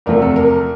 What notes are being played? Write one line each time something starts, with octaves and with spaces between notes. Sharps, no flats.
E2 C3 F3 A3 A#4
A4
A#4